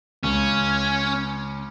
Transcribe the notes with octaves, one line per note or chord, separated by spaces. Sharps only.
C#2 C#4